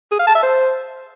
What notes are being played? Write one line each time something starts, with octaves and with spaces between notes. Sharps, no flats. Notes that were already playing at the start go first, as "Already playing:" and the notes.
G#4
F5
A5
E5
C5